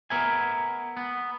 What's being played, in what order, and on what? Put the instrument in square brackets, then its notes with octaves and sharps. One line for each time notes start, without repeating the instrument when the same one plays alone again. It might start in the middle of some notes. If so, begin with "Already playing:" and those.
[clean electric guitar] B3 A#4 E5 G#5
B3